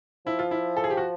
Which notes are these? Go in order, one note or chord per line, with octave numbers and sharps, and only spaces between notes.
F3 E4
F4
E4
A4
G#4
G4
F#4